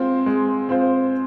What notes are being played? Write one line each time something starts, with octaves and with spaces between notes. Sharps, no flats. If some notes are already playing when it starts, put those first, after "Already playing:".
Already playing: G#3 C4 F4 C5
G#3
C4 F4 C5